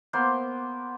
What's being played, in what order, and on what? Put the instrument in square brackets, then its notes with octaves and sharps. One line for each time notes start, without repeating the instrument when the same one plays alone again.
[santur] A#3 B3 C5 C6